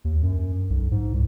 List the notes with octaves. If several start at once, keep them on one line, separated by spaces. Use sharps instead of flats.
D#2
F#2
B1
G#2
C2